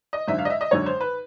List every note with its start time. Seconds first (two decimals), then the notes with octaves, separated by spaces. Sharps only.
0.13 D#5
0.27 G#1 F#2 D3 E5
0.38 F5
0.45 D#5
0.50 E5
0.61 D#5
0.71 G#1 F#2 D3 C#5
0.86 C5
1.01 B4